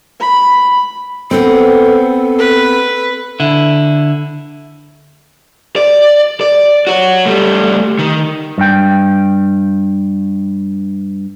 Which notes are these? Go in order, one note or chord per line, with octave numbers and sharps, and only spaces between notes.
B5
B3 C4 A4
B4
D3 E4
D5
D5
F#4 C#5
G3 A3
D#3
G2 G5